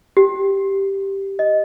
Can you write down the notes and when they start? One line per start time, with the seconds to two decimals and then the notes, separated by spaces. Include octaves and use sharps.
0.17 G4
1.39 D#5